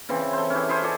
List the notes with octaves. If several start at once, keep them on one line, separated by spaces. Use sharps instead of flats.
C#3 E3 C4
A4 C5
C#4 E4 G4
E4 G#4 C5 C#5
G#4 A4 C#5 D5